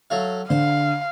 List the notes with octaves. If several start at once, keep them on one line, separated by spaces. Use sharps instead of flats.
F#3 A3 F5
D3 C5 F5